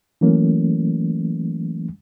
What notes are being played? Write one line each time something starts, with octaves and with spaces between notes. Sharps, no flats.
E3 F#3 A3 A#3 C#4